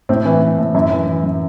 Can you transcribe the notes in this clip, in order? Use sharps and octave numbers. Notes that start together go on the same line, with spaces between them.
A2 C4
E3
E3
A2
F#2 E4
E3
E3
F#2